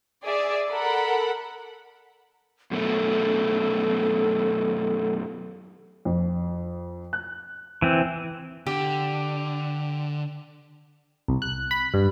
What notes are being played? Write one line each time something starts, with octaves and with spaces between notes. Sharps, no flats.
G#4 D5 E5
A4 A#4 F#5 B5
F#2 B2 A3 A4
F2
F#6
E3 C4
D3 G4
C2
F#6
B5
G2